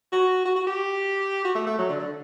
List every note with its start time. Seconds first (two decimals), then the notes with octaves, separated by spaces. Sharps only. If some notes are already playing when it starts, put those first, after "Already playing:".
0.12 F#4
0.45 F#4
0.56 F#4
0.67 G4
1.45 F#4
1.55 A3
1.66 A3
1.78 F#3
1.89 D3
2.00 D3